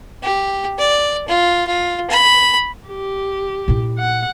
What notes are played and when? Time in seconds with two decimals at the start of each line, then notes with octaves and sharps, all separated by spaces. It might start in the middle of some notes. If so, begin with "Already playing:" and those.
0.23 G4
0.79 D5
1.28 F4
1.67 F4
2.10 B5
2.88 G4
3.68 A#2 E4
3.99 F#5